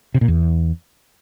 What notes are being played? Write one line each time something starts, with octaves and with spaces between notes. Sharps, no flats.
C3
A#2
E2